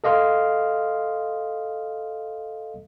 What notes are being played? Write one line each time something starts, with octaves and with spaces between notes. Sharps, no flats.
A4 D#5 F5 C6 F6